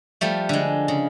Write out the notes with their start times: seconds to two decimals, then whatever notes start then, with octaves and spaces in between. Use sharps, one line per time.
0.21 F3 G3 A3
0.49 D3 G#3
0.88 C#3